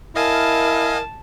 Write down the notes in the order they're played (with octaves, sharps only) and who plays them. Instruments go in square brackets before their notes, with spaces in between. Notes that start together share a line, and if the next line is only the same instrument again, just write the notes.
[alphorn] E4 [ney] A#4 [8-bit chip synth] D#5 F5 G#5 [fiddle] A5